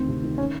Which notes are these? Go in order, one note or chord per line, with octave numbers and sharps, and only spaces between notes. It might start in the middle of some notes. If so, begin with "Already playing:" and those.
Already playing: D2 D#3 C4
C3
D#3
C#4